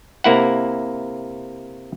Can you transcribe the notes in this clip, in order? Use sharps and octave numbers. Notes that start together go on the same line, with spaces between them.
C3 A#3 E4 F#5